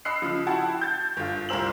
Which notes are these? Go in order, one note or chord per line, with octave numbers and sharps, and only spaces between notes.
D#5 B5 E6 F#6 C7 C#7
C#3 F3
E4 F#4 F#5 G5 A5
G6 A6
G1 F4
C2 F4 A#4 C5 E6 F#7